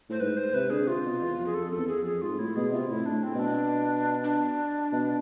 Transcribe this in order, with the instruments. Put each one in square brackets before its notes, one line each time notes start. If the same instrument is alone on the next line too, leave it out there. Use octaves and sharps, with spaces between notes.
[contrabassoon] A2 [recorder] C5
[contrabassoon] G#2 [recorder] B4
[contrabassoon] G#2 [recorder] C5
[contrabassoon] C3 [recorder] B4
[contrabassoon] D3 [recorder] G#4
[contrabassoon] C3 [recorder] F4
[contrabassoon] B2
E2
F2
[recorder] G#4
[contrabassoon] F2 [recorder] A4
[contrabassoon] F2 [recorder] A4
[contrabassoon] E2
[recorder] G#4
[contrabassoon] F2
[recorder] G#4
[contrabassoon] G#2 [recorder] F4
[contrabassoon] A2 [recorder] E4
[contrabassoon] B2 [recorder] G#4
[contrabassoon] C3 [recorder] F4
[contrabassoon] A2 [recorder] E4
[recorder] D4
[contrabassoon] A2
[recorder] C4
[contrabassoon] B2 [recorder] D4
[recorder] D4
[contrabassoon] B2